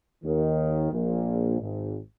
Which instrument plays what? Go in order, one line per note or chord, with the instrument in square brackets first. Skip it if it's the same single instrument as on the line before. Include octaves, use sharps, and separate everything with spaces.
[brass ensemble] D#2 D#3
A#1 A#2
G#1 G#2